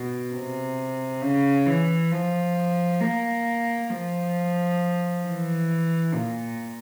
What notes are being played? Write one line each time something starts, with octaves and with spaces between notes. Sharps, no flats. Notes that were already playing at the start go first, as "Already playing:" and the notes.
Already playing: B2
C3
C#3
E3
F3
A#3
F3
E3
A#2